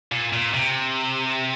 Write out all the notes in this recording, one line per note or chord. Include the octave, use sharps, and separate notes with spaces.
A#2
A#2
C3